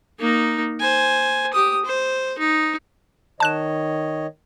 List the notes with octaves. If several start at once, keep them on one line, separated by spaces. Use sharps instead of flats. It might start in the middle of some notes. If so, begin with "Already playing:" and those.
A#3 D#4
C5 G#5
G4 D#6
C5
D#4
D#3 C#5 D#5 A5 F#6 E7